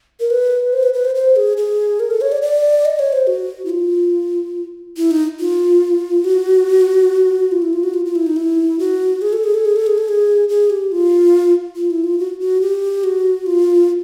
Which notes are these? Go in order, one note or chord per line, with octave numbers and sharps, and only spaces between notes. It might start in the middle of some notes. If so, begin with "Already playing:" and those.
A#4
B4
C5
B4
B4
C5
C5
G#4
G#4
A#4
A4
C#5
D5
D5
D#5
C#5
C5
F#4
E4
F4
E4
D#4
F4
F#4
F4
E4
F4
F#4
F4
F4
E4
D#4
E4
F#4
G#4
A4
G#4
A4
G#4
A4
G#4
A4
G#4
G#4
G4
F4
F4
E4
F4
F#4
F#4
G4
F#4
F4